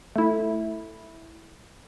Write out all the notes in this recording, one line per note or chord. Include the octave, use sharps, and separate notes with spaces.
A3 E4